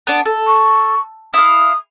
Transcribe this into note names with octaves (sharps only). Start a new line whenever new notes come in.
B3 D4
A4
C#6
E4 F5 D#6